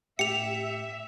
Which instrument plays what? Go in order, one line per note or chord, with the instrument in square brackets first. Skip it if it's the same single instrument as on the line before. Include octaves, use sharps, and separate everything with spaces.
[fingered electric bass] A2 [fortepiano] G4 [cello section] E5 [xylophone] C#7 F7